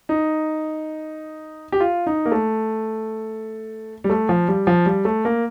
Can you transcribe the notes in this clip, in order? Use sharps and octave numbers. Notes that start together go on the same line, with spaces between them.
D#4
G4
F4
D#4
A#3
A3
G3
A3
F3
G3
F3
G3
A3
A#3